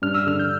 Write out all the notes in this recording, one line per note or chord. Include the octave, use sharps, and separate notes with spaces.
G2 F6
E6
D3 F6
G6